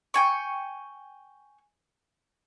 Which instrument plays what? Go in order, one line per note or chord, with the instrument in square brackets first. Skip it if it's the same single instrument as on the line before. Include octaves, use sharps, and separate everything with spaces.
[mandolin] G5 G#5 C#6